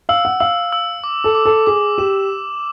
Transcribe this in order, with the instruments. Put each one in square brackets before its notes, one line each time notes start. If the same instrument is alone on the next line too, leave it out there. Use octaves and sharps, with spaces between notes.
[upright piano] F5 [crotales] E6
[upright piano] F#5
[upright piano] F5 [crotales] E6
[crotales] E6
D6
[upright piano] A4
[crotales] D6
[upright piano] A4
[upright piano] G#4 [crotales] D6
[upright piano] G4 [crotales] E7